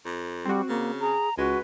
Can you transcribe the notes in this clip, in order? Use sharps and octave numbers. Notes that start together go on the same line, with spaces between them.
F2
G3 C4 F#4
C#3 A#3
G#4 A#5
C#2 G#3 F#4 B4